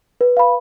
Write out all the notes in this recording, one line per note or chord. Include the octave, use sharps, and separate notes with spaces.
B4
F5 B5